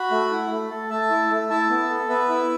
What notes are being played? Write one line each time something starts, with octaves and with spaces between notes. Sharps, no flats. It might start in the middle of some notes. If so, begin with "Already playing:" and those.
Already playing: F#4 F#5 B5
A3
E4
A3
A4
A3 E5 A5
E4
A3
E4 E5 A5
B3
A4
B3 B4 E5
E4